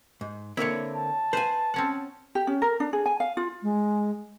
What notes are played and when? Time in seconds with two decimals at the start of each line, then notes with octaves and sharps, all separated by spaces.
0.21 G#2
0.57 D3 A#3 C4 E4 C#5
0.93 A5
1.33 B4 C5 F5 G#5
1.74 C4 C#4 F#5
2.35 G4
2.47 C#4
2.62 A#4
2.80 D4
2.93 G#4
3.06 G#5
3.20 F5
3.37 F4
3.63 G#3